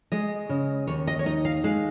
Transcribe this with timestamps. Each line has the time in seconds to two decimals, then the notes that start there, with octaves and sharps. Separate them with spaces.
0.12 G#3 D#5
0.49 C#3
0.87 D#2 C#5
1.07 D#5
1.19 C#5
1.26 D#4 D#5
1.45 F5
1.64 G#3 F5